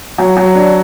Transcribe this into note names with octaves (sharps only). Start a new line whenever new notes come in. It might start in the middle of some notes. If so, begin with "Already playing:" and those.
F#3
F#3
D4